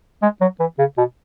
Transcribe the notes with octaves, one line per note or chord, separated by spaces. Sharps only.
G#3
F#3
E3
C#3
B2